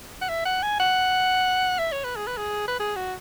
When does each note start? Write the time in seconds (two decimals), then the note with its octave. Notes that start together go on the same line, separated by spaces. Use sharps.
0.22 F#5
0.29 E5
0.45 F#5
0.63 G#5
0.80 F#5
1.79 E5
1.92 C#5
2.04 B4
2.16 G#4
2.27 B4
2.37 G#4
2.68 B4
2.80 G#4
2.96 F#4